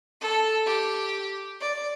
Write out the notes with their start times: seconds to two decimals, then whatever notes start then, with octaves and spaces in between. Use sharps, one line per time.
0.21 A4
0.66 G4
1.60 D5